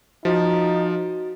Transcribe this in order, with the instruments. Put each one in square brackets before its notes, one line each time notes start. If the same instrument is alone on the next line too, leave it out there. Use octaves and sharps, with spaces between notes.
[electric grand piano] F3 [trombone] D#4 [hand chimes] F#4 A6